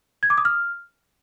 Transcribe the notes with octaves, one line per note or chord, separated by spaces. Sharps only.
G#6
D6
D#6
F6